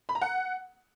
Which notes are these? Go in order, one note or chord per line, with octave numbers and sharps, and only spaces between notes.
B5
A#5
F#5